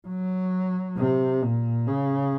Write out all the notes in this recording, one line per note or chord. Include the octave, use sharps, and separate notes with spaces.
F#3
C3
A#2
C#3